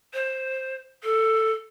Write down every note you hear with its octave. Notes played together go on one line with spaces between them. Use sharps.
C5
A4